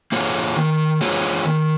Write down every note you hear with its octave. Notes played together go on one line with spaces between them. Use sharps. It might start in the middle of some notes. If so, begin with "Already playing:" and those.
A#3 F4 G#4 C#5
D#3
A#3 F4 G#4 C#5
D#3